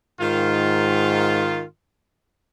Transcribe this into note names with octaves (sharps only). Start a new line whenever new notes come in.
G#2 D#3 F4